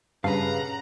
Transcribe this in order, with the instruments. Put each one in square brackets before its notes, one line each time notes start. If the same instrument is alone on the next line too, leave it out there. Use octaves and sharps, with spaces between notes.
[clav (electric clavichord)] G2 A5 [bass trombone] C#3 [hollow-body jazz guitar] B4 F5 [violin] F#5 A#5